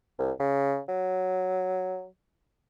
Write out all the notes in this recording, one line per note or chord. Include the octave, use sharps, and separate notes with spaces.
C2
C#3
F#3